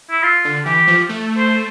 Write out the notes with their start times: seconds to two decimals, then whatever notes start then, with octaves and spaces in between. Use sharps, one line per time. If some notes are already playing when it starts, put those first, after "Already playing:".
0.11 E4
0.23 F4
0.45 D3
0.66 E3 G4
0.88 F3
1.09 A3
1.38 C5